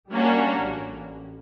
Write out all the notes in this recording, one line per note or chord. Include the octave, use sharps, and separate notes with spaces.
G3 A#3 C#4 D4 F#4
A1